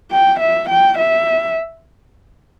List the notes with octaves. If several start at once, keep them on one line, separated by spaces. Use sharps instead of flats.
G5
E5
G5
E5